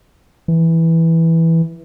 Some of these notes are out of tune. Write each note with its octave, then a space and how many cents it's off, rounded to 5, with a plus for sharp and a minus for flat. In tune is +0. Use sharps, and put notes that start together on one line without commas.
E3 -5